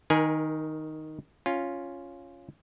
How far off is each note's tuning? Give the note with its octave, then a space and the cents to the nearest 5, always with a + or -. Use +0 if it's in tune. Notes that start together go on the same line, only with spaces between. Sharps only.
D#3 +0 A#4 +35 G#5 +0
C#4 +0 F4 +0